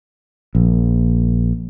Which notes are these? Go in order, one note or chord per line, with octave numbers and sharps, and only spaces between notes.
A#1